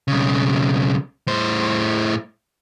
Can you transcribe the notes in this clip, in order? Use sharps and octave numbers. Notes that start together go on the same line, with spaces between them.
B1 C#3
A2 C5